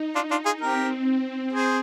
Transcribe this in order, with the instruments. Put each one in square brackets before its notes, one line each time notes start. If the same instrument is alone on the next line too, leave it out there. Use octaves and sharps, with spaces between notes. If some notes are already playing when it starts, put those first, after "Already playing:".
Already playing: [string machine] D#4
[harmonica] D4 F4
D4 F4
F4 G#4
[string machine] C4 [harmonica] G4 A#4
[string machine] C4 [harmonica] G#4 C5